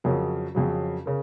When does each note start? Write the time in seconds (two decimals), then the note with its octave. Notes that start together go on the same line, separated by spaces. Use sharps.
0.04 F2 C#3 F#3 A#4
0.55 F2 C#3 F#3
1.06 C#3 A#4